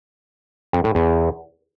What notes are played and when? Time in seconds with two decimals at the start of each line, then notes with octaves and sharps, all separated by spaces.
0.73 F2
0.84 A2
0.95 E2